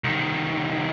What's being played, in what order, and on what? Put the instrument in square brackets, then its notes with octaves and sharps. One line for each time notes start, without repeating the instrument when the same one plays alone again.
[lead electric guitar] C2 D#3